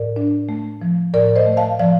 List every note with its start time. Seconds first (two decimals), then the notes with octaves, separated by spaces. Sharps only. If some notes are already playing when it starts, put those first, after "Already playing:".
Already playing: A2 A#4 D5
0.16 D4
0.49 A3
0.82 F3
1.14 A2 A#4 D5
1.36 C5 D#5
1.46 A3
1.57 F5 A5
1.79 F3 D5 F5